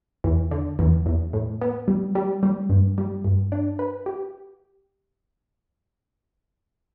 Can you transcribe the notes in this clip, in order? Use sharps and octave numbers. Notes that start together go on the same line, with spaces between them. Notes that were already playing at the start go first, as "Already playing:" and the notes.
E2
D3
E2
E2
A2
B3
G3
G3
G3
G2
G3
G2
D4
B4
G4